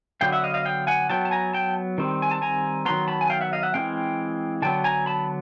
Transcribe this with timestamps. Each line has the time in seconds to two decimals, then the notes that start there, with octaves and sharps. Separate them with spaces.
0.21 D3 F#3 B3 F5 G5
0.32 E5 F#5
0.44 D#5 F5
0.54 D#5 F5
0.65 F5 G5
0.87 F#5 G#5
1.10 F#3 B3 G5 A5
1.25 A5
1.31 G#5 A#5
1.54 G5 A5
1.98 D#3 G3 C4
2.22 G#5
2.31 A5
2.42 G#5 A#5
2.85 D#3 F#3 B3 A#5 C6
3.08 A5 B5
3.21 G#5
3.30 F5 G5
3.41 E5 F#5
3.53 D#5 F5
3.63 E5 F#5
3.74 E3 G#3 C4 F5 G5
4.62 D3 F#3 B3 G5 A5
4.84 G#5 A#5
5.06 A5 B5